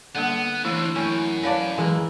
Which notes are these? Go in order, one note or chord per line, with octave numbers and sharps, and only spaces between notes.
D3 G3 A#3 B3 F#5
E3 A3 C4 D4 E4
F#2 C#4 G5
B4 C#5 D5 F5 A5
E3 G#3 A#3